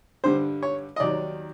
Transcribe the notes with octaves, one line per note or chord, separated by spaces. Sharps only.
G2 D3 G3 C5
C#5
D#5
D#2 D#3 F#3 D5